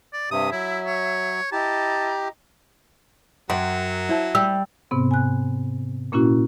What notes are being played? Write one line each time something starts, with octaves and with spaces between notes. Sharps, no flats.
D5
G2 C3 E5 D#6
F#3 E4
C#5
E4 G4 D#5 A5 A#5
F#2 F#3 G5 C6
E4 C5 A5
G3 E6
G#2 C3 B3 C4
G#5 F#6
A#2 A#3 C#4 E4 F#4